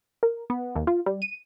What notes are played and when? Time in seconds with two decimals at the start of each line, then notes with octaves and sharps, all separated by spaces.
0.23 A#4
0.50 B3
0.75 D#2
0.87 F4
1.06 G3
1.22 D#7